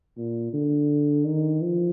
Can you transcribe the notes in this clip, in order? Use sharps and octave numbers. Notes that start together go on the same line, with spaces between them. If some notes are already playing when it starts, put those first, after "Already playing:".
A#2
D3
D#3
F3